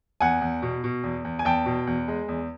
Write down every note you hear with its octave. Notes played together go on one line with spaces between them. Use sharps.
E2 F#5 G#5
E2
B2
B2
E2
E2
G#5
E2 G5 A5
B2
E2
G#3
E2